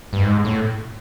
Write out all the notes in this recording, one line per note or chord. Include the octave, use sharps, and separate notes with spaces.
G2
G#2
A2